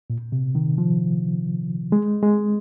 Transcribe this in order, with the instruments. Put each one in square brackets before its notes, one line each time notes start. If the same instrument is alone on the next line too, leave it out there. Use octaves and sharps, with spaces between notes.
[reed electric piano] A#2
C3
D#3
F3
G#3
G#3